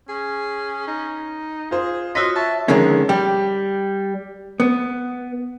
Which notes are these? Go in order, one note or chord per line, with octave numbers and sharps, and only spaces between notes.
C#4 G#4
D#4
F4 G#4 C5
F4 F#4 C#5 D#5 C6 E6 B6
C#5 E5 A5
F2 D3 D#3 G#3 C#4
G3 G4
B3